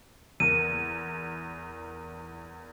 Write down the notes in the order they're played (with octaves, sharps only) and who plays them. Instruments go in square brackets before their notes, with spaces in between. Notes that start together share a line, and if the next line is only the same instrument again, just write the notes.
[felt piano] E2 A#4 [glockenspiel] D#7